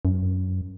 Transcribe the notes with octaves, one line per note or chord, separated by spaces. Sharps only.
F#2